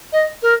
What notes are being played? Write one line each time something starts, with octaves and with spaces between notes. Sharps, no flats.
D#5
A#4